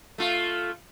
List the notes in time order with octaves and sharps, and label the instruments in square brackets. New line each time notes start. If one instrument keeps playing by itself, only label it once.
[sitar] A3 F4